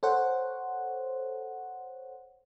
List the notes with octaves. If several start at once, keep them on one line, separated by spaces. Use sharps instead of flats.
A4 C5 C#5 F#5